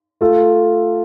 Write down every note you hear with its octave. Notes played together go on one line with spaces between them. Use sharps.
A3 F4 A4